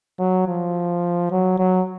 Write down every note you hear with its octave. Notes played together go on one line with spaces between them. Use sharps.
F#3
F3
F#3
F#3